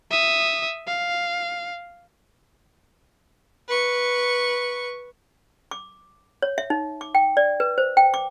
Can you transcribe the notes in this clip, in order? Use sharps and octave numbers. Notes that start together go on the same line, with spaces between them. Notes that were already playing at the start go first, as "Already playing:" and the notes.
E5 D#6
F5
B4 C#6
D6
C#5
E5
D#4
D6
G5
D5
B4
C5
G5
D6